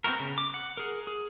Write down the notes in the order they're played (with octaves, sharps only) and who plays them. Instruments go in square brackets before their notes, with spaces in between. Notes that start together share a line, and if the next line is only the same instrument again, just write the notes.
[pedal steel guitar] B3 C4 E4 F#4 A#4
C#3
D6
F#5
G#4 A#4
G#4